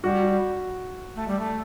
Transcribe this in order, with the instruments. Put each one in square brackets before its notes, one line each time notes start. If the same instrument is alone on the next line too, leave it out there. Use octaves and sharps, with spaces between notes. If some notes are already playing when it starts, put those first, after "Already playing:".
[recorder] G3 [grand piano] F#4
[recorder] A3
G3
A3